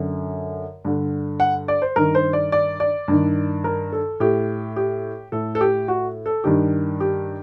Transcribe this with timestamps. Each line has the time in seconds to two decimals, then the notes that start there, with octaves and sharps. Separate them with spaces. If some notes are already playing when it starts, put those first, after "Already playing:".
Already playing: F#2 D3
0.85 G2 D3
1.40 F#5
1.68 D5
1.82 C5
1.96 G2 D#3 A#4
2.15 C5
2.33 D5
2.52 D5
2.80 D5
3.08 G2 D#3
3.64 A#4
3.92 A4
4.20 A2 G4
4.76 G4
5.32 A2 A4
5.55 A4
5.61 G4
5.88 F#4
6.26 A4
6.44 G2 D#3 G4
7.00 G4